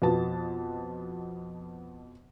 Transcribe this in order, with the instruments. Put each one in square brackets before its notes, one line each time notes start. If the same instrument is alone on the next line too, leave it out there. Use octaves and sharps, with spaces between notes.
[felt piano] F2 B2 B3 F#4 A5